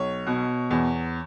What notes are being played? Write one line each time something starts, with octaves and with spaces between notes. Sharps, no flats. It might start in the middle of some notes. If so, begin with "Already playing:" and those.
Already playing: B1 C#5
B2
E2